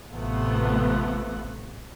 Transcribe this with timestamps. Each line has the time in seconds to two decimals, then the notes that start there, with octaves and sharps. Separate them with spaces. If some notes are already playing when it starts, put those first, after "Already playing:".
0.11 A1 C3 A3 B3 F4 F#5